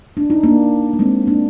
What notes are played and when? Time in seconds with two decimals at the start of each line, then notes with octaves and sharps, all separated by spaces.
0.17 D4
0.30 D#4
0.43 A#3 D4
0.93 A#3
0.99 G#3 C4
1.27 A#3 D4